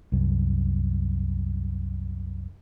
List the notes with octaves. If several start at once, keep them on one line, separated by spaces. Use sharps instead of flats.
C2 F#2